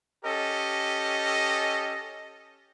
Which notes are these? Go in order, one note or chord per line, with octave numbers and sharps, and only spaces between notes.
C#4 G4 A4 D#5